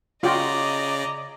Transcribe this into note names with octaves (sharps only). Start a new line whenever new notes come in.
C#3 F4 F#4 D5 D#5 G5 A#5 D6